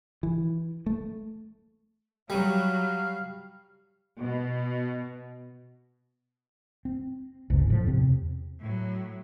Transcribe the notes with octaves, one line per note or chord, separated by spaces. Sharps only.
E3
A3
F#3 G3 F5
B2
C4
F1 C#2 G#2
A2 F3
E2 C3 C4
A2 F#3